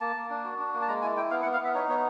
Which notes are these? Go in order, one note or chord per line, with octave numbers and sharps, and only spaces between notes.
A#3 A5
A#3
D4
F#4
D4
A#3
A5
G#3 A#5
E4 G#5
E4 G5
B3 F5
F#5
B3
F5
B3 E5
D#4 C#5
B3 C#5